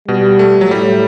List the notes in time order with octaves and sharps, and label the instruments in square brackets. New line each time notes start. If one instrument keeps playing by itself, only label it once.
[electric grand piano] B2 [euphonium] G3
[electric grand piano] A3
F#3
[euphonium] A2 [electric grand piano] G3